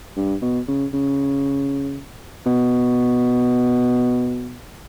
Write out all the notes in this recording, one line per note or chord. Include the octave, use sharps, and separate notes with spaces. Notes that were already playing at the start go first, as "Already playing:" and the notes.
G2
B2
C#3
C#3
B2